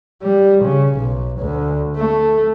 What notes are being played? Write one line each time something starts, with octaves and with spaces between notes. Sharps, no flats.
G3
C#3
B1
D2
A3